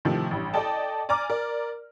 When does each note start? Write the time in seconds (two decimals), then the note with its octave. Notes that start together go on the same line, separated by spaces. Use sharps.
0.05 A2 C3 D#3 F3
0.31 A1 G2
0.54 A4 D5 D#5 G5 A5
1.09 D5 G#5 A#5 D6 F6
1.30 A#4 D5